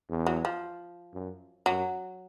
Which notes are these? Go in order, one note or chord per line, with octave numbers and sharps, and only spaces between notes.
E2
F#3
F3
F#2
F#2 F#3